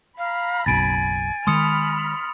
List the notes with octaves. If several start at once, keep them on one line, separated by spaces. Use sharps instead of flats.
F5 A#5 B5
F#1 B1 F#2 G#5 A6 D7
D#3 G#3 B5 C6 D#6 F6 C#7